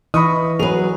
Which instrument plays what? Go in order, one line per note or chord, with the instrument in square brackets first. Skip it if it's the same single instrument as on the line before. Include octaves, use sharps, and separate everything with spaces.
[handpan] E3 E4 D#5 [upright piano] B5 C#6 D#6
[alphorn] F#3 [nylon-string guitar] G#4 B4 [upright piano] F7